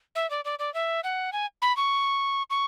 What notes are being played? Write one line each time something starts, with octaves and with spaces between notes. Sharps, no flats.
E5
D5
D5
D5
E5
F#5
G#5
B5
C#6
C#6